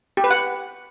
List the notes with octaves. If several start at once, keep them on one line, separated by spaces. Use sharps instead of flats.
G4
B4
F#5